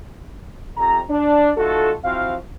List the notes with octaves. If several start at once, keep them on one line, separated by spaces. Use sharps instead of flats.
F2 C3 A#5
D4
A3 D#4 F4 F#4 A4
F3 C4 E4 F#4 F5